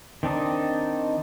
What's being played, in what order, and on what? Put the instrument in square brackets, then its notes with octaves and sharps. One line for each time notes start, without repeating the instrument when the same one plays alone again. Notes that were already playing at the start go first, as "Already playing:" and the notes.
[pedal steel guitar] D#3 C4 D4 D#4